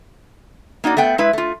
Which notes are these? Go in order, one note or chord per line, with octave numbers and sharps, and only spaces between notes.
A#3 D#4 F#4 D5
A3 B3 F#5 G5
G#3 E4 B4 E5
A3 F4